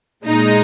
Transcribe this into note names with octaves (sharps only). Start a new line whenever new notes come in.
A#2 G#3 D#4